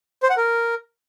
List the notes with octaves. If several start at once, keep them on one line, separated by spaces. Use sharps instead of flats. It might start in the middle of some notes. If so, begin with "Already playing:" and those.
C5
F#5
A#4